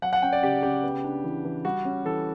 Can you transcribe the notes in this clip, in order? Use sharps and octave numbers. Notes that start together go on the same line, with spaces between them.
F#3 F#5
F#5
C#4 G5
D5
C#3 G4
C#3 G4
B3
D4
E3
E3
G3 F#4
C#4
E3 A4